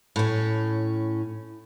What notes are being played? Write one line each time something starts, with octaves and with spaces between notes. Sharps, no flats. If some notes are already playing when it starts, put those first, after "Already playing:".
A2 C#4